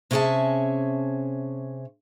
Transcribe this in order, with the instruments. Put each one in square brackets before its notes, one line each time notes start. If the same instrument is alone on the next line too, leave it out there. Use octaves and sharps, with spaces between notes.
[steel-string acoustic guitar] C3 C#4 E4 G#4 E5 A5